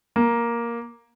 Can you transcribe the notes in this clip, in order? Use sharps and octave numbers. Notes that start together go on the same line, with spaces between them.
A#3